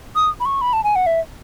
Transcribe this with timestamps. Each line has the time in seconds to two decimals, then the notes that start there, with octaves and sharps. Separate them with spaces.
0.16 D#6
0.40 B5
0.46 C#6
0.61 B5
0.73 A5
0.84 G#5
0.96 F#5
1.06 E5